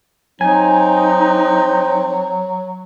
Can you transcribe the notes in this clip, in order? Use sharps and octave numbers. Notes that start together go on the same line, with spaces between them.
F#3 C4 D#4 G#5